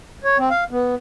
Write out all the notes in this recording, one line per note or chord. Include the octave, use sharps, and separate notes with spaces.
C#5
C4
F5
B3